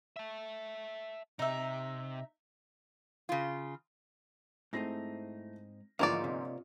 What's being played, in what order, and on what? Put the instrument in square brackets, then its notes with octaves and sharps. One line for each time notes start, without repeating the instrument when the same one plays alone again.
[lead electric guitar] E5 A5
[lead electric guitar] C3 [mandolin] D#4 E5
[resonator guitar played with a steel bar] C#3 F4
[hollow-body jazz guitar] G#2 C4 D#4 [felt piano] A3 E4 A#6
[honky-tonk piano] G1 G#2 F3 [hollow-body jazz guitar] E3 [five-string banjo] A#3 C#5 D5 [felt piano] F4
[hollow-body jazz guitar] C3